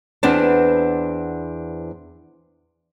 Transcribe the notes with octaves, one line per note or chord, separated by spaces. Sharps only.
E2 B3 C4 D4 B4 A5